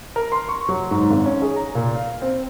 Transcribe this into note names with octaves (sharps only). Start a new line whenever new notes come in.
A#4
C6
C#6
F#3
G#2
G#1
C#4
G#4
A#5
A#2
F5
C4